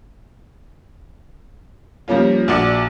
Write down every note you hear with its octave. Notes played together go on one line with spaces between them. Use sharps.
F3 G3 A#3 C#4 F4
A#1 F#4 D5 C#7